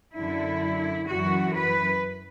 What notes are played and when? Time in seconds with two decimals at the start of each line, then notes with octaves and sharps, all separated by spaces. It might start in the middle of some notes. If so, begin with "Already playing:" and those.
0.16 F#2 D3 E4
1.08 F#2 E3 F#4
1.55 B4